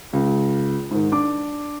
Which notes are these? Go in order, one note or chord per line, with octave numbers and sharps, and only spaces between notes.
C#2
G#2 D#3
D4 D6